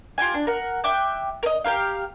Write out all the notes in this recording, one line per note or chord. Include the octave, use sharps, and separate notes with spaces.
F4 G4 G5 G#5
D4
A#4 F#5
E5 G5 D6 F#6
A#4 D#5
G4 G#4 A#4 F5